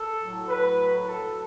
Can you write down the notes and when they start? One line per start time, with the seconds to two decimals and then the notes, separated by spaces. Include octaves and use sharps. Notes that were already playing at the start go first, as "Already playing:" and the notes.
Already playing: A4
0.21 A2 F#3
0.49 B4
1.07 A4